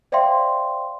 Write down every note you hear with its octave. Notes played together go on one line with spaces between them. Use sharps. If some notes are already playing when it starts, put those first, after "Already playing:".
C5 D5 E5 F5 G5 C6